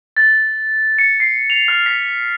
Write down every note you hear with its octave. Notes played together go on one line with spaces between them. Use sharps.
A6
C#7
C7
F7
F6
B6